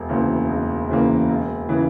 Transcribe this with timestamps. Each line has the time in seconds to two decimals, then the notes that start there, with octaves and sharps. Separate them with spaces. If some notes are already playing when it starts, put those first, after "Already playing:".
Already playing: E1
0.09 D2 C#3 E3 A#3
0.49 E1
0.89 D2 C#3 E3 A#3
1.29 E1
1.69 C#3 E3